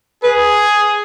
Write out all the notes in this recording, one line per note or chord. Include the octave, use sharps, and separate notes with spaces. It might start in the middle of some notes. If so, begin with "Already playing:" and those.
G#4 B4